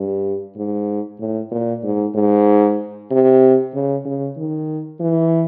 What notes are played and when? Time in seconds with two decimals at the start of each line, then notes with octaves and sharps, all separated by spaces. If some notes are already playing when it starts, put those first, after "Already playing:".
Already playing: G2
0.56 G#2
1.19 A2
1.51 A#2
1.83 G#2
2.15 G#2
3.11 C3
3.74 C#3
4.05 C#3
4.37 D#3
5.00 E3